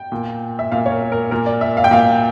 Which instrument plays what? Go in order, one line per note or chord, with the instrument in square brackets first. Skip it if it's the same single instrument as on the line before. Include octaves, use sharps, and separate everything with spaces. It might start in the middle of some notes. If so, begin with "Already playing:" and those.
Already playing: [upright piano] G5
A#2
E5
A#2 F5
C#5
A#4
A#4
A#2 A#4
D5
E5
F5
G5
A#2 F5